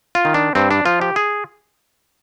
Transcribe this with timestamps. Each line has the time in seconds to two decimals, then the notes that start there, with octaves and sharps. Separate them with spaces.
0.15 F4
0.25 D#3
0.34 D4
0.55 G2 C4
0.71 D4
0.86 F3 F4
1.01 G4
1.16 G#4